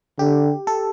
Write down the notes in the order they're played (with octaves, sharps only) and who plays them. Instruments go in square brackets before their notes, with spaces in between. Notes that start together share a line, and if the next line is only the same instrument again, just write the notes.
[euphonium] D3 [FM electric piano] G4
[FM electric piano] A4